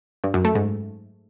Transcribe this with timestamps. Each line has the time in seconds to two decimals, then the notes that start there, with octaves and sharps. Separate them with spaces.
0.24 G2
0.34 F#2
0.45 A3
0.55 G#2